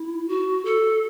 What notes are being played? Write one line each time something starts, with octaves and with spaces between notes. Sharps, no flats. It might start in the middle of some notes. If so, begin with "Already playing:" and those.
Already playing: E4
F#4
A4